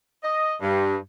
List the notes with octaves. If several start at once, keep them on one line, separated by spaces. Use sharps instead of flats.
D#5
G2